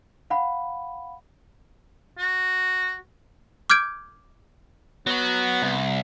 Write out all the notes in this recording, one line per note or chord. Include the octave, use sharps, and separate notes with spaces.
F5 F#5 B5
F#4
D6 F6 G6 G#6 D7
F#3 B3 F#4
C2